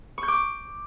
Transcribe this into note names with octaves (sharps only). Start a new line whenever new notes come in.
C#6
G6
D6